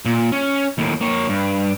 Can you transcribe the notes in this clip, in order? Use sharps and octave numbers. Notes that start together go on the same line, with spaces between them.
A#2
C#4
D#2 A2
A#3 C#5
G2